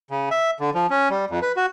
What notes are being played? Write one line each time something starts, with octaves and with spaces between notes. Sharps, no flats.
C#3
E5
D3
F3
C#4
G3
F2
B4
F#4